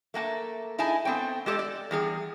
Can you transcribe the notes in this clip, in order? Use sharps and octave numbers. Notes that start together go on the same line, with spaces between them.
A3 A#3 F#5 A5
D#4 E4 G#4 G#5 A5
A3 B3 C4 C#5 G5
G#3 G4 A4 A#4 D5 D#5
D5
E2 G3 G#4